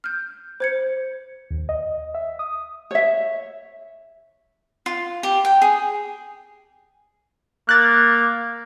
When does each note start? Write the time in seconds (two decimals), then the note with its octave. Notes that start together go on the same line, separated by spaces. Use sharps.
0.04 F6 G6
0.60 C5 G#6 C#7
1.51 D#2
1.69 D#5
2.14 E5
2.39 D#6
2.91 C#5 E5
4.86 F4
5.23 G4
5.45 G5
5.62 G#4
7.69 A#3 F#6 A6